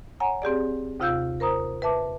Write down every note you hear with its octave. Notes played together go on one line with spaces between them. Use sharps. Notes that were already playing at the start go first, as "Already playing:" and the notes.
C#5 F#5 G#5 A#5
C4 G4 G#4 D5
D#2 C3 F4 F5 E6 G6
A#4 C5 A#5 D#6
B4 E5 A5 D6